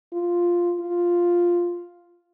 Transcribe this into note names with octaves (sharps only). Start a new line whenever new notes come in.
F4
F4